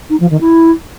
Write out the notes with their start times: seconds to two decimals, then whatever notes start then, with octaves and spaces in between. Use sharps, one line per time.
0.10 D#4
0.20 F3
0.30 D#3
0.41 E4